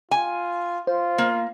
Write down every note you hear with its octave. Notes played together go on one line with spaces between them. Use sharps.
F4 G#5
F4 C5
A#3